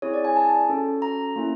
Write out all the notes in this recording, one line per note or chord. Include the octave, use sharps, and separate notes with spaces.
C4 E4 G#4 C#5
D5
G#5
A5
C#4 F#4 A4
A#5
A#3 C#4 E4